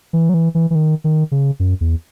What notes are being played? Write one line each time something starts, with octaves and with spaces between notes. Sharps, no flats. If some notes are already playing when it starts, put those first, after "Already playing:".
E3
F#3
E3
E3
E3
D#3
D#3
C#3
F#2
E2